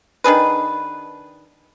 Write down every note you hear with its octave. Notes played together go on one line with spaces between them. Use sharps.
D#3 D4 G#4 B4